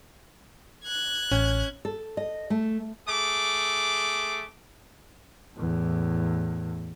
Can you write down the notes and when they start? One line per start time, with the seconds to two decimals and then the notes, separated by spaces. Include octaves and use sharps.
0.84 F#6 G#6
1.32 A1 C#4
1.85 A4
2.17 D#5
2.50 A3
3.08 A3 G#4 D6
5.57 E2 A2